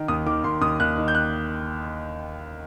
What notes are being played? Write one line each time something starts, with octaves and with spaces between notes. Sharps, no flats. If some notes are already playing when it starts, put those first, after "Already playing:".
Already playing: D#3
D#2 D#6
D#3 D6
D#2 C6
D#2 D#6
D#2 F#6
D#3
G6
F#6